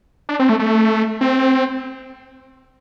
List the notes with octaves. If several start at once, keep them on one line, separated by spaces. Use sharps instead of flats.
D4
C4
A3
A3
C4